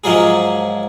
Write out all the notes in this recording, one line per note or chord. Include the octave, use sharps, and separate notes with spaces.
G#2 F3 F#3 A#3 G#4